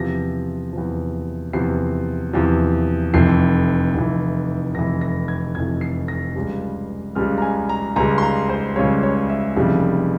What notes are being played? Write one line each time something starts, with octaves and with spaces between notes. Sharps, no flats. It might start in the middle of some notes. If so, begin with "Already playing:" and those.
Already playing: E2 C3 F3 A#6
E2 C3 F3
E2 C3 F3 C7
E2 C3 F3
F1 F2 E3 C7
F1 F2 E3
F1 F2 E3 A#6
A#6
G#6
F1 F2 E3 G#6
C7
A#6
C#2 C#3 G3
C#2 C#3 G3 F6
A#5
G#5
A#5
C#2 C#3 G3 A#5
C6
A#5
C5
C#2 C#3 G3 C#5
C#5
E5
F1 F2 C#3 E3 G3